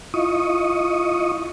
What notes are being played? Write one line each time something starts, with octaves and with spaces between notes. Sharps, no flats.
E4 F4 D#5 C#6 D#6